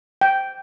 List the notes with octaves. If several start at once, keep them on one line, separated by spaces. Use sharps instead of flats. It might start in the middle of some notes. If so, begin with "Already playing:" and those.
G5